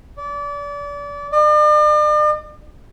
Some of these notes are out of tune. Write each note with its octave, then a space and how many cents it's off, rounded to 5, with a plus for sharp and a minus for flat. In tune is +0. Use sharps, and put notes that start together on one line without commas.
D5 -30
D5 +45